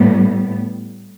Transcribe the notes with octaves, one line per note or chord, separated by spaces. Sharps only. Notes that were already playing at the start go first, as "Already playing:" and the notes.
Already playing: A2 G3 B3